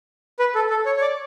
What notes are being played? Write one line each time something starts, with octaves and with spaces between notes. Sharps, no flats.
B4
A4
A4
C#5
C#5
D5